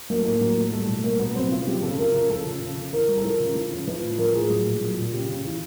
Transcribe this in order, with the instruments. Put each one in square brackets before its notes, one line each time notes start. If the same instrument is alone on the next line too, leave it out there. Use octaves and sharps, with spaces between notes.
[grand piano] F#3 A#3
A3
A2 A#3
F#3
A2
G3 A3
B2
G3 A#3
B2 B3
F#3 C4
C#3 F4
F#3 G4
C#3 A4
F3 A#4
C#3 A#4
F3 A4
C#3
C#3
C#3
E3 A#4
G3
A4
F3 A#4
C#3
F3
C#3
F3 B4
A2
F3 A#4
A2 G#4
F#3
A#2
F#3
A#2
C#3 G4
C#3
E3